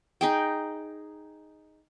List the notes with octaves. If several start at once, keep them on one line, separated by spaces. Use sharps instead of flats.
D#4 G#4 G5